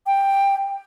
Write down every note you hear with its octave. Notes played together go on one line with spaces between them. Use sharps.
G5